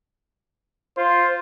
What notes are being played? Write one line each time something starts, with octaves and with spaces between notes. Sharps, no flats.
F4 C5